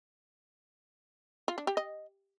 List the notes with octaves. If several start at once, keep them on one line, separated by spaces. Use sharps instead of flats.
F4
D4
G4
D#5